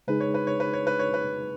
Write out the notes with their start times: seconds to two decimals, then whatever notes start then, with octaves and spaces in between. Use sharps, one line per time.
0.08 C#3 G#3 D#4 G#4 B4
0.20 C#5
0.34 B4
0.47 C#5
0.60 B4
0.73 C#5
0.87 B4
0.99 C#5
1.14 B4